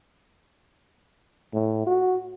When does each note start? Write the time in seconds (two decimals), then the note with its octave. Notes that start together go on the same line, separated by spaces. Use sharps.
1.53 A2
1.86 F#4